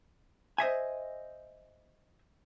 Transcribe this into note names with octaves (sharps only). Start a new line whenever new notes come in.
C5 D#5 E5 G#5